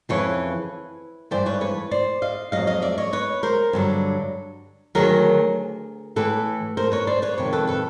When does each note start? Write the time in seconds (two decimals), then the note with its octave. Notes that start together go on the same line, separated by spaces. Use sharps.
0.09 F2 C#3 E3 B4 C#5
1.31 G2 E3 C5 D5
1.46 B4 C#5
1.61 B4 C#5
1.91 C5 D5
2.22 D#5 F5
2.52 F2 C#3 F#3 D#5 F5
2.67 D#5 F5
2.82 D5 E5
2.98 C#5 D#5
3.13 B4 C#5
3.43 A#4 C5
3.73 G2 D3 F#3
4.95 D2 C3 D#3 F#3 G#4 A#4
6.16 A2 E3 A4 B4
6.77 A#4 C5
6.92 B4 C#5
7.07 C5 D5
7.22 B4 C#5
7.38 F2 C3 D#3 C#5
7.53 A4 B4
7.67 A4 B4